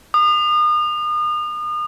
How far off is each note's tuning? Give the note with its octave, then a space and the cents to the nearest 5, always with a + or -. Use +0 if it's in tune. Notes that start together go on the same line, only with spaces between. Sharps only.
D#6 -35